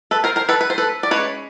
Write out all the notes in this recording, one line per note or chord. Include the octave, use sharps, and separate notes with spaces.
A4 B4
A#4 C5
A#4 C5
A4 B4
B4
C5
A4 B4
D5
G#3 C#4 B4 C#5